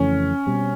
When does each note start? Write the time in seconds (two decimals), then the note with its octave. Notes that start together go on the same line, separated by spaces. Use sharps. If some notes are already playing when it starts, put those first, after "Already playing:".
Already playing: F2 C#3 E3 A3 C#4
0.46 B2 G3 C4